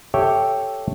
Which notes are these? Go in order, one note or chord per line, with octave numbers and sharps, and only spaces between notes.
G4 A4 C#5 E5 G5